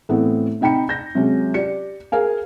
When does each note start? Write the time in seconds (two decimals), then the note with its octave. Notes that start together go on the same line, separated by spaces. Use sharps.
0.09 A2 E3 A3 B3 C4
0.61 C3 D#4 G5 B5 C#7
0.89 G6 A#6
1.15 C3 F#3 G#3 C#4
1.54 G4 D5 C#7
2.12 G#4 A#4 F5 G#5